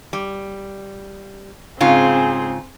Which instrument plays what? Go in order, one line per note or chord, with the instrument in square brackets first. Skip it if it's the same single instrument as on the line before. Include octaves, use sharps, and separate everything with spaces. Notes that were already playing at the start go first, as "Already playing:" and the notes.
[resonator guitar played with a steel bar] G3
[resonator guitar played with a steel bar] G#2 C#3 F4 [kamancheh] C4 G#4